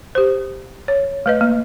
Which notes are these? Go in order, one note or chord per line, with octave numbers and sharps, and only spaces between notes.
G4 C5
C#5
A3 B4 D#5
A#3